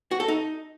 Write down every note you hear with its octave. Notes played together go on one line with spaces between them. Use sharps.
F#4
A4
D#4